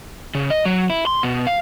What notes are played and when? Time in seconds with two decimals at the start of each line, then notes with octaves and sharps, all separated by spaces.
0.35 C#3
0.50 D#5
0.66 F#3
0.90 E4
1.07 C6
1.23 B2
1.47 F5